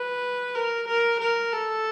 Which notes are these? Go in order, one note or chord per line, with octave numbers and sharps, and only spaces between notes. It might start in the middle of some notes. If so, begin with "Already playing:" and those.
Already playing: B4
A#4
A#4
A#4
A4